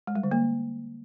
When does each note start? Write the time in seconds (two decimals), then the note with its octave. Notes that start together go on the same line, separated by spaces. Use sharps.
0.07 G#3
0.15 G3
0.23 D3
0.31 A#3